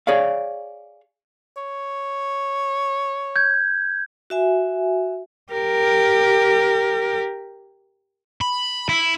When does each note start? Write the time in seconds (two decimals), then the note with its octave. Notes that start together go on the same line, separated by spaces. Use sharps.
0.07 G#4 C#5 D5 F5
1.57 C#5
3.36 G6 G#6
4.30 F#4 E5 G#5
5.52 G4 A#4
8.41 B5
8.89 E4